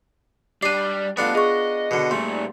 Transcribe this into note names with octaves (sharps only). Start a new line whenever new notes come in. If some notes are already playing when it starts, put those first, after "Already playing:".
G3 D4 D5 C7 D#7
G3 A3 B3 D4 F4
G#4 D#5 C#6
B2 D3
A#2 G3 A3 C6